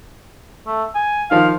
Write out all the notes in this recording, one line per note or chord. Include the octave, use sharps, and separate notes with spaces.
A3
G#5
D#3 F3 F5